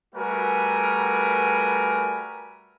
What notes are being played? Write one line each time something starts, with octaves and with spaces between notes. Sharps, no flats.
G3 A3 F#4 A#4 B4 G#5